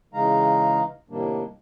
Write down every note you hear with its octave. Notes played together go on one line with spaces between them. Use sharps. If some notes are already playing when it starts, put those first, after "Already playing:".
C#3 E3 G#3 D#4 F5 A#5
A2 C3 D#3 G3 A#3 D4